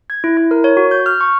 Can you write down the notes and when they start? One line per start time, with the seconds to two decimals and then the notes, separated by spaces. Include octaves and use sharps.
0.10 G#6
0.24 E4
0.37 E4
0.51 A#4
0.64 C#5
0.77 F#4
0.91 G6
1.06 F6
1.21 C#6